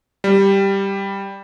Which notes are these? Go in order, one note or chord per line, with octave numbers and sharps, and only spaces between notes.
G3